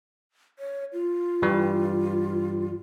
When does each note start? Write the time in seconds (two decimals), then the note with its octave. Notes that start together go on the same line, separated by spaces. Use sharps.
0.59 C#5
0.93 F4
1.42 G2 E3 G3